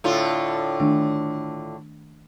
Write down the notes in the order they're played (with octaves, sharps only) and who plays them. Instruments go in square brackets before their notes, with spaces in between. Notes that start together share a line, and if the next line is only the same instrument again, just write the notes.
[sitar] A2 D3 F4
[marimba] D#3 A3 D4